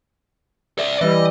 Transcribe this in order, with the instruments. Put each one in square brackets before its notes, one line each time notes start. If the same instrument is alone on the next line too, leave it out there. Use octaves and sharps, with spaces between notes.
[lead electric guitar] D5 E5
[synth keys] E3 G3 [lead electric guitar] D#5